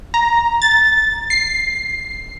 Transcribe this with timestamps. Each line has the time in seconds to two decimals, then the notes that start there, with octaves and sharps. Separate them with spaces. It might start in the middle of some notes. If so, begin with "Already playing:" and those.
0.14 A#5
0.62 A6
1.30 C7